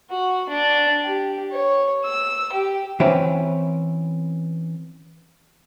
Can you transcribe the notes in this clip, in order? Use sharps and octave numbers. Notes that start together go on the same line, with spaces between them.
F#4
D4
G4
C#5
E6
G4
E3 C4 C#4 B4 G5